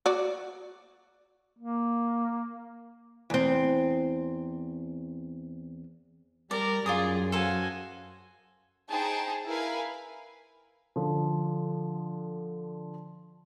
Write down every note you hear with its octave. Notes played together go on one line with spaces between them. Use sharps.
F#4 D5
A#3
E2 C4
G3 A#4 D5
F#2 F4 G#4 D5 D#6
F#4 A4 C5 F5 G#5
D#4 G#4 C5 G5 A5
E4 A#4 B4 F5 G#5 B5
D3 F3